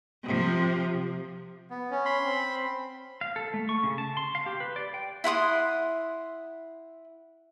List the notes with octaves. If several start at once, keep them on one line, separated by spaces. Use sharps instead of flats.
C3 F3
B3
C#4
B5 C6
C4
F5
A4
A3
C#6
C#3
A5
C6
F5
G4
B4
D5
G5
E4 F#5 C6 D#6